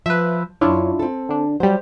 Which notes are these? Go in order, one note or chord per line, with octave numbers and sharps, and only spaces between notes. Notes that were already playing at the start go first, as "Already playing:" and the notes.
F3 B4 E5
F#2 B2 D4 E4 F4 C#5
C4 A4
D3 D4
F#3 G3 G4 C5